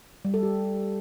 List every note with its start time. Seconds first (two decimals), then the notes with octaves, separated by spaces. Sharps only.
0.25 G3
0.34 A4
0.43 G4